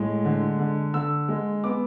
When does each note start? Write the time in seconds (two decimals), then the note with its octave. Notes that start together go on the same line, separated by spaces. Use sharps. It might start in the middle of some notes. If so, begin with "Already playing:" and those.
Already playing: A2 G#3
0.25 D3
0.59 D3
0.94 D3 E6
1.28 G#3
1.64 B3 D6